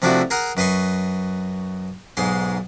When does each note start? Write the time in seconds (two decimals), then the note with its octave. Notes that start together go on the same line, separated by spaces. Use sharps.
0.02 C3 F3 A3 D4 E4 F#4
0.30 G#4 A#4 F#5 A#5
0.57 F#2 B4 D#5 C6 C#6
2.17 B1 G#2 G#3 C6